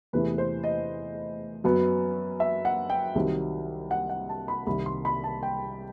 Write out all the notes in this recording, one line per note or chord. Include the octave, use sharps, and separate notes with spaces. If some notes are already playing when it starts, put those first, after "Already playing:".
E2 C3 E3 A3 B4
C5
D#5
F#2 F#3 B3
E5
F#5
G5
C2 C3 D#3 F#3
F#5
F#5
A5
B5
C2 C3 D#3 B5
C6
B5
A5
G5